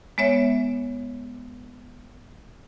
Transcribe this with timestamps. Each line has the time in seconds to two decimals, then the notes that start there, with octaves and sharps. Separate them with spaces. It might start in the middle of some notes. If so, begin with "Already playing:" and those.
0.18 G#3 B3 C#5 E5